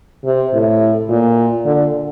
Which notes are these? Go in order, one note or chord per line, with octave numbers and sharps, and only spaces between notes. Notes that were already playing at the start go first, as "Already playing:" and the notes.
C3
A2
A#2
D3